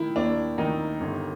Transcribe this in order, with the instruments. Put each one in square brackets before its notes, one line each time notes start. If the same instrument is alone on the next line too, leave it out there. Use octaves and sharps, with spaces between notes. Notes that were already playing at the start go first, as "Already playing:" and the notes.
Already playing: [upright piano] D#3 E4
D#2 D4
D#3 D#4
G1